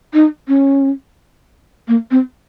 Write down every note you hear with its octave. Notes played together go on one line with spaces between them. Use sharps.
D#4
C#4
A#3
C4